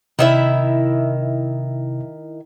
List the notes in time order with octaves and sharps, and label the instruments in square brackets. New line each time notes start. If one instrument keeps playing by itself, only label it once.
[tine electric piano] C3 [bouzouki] D#3 E4 E5